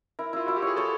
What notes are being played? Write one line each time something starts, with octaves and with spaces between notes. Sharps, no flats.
E4 A#4
E4 F4
E4 F#4
G4
G#4 C#5
A4 C#5